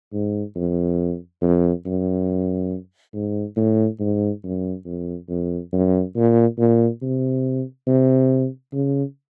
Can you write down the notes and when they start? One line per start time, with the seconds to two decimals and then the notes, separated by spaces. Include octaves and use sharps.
0.13 G#2
0.55 F2
1.42 F2
1.86 F#2
3.14 G#2
3.57 A2
4.00 G#2
4.43 F#2
4.86 F2
5.29 F2
5.73 F#2
6.16 A#2
6.58 A#2
7.02 C3
7.87 C3
8.73 C#3